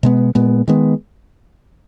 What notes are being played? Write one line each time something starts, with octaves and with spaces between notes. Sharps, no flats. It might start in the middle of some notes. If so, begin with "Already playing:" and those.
B2 G#3 B3
A#2 G#3 B3
D#3 G#3 B3